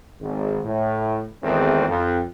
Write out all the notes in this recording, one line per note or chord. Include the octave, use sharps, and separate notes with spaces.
G#1
A2
G#1 E2 D#3 A3 C4
F2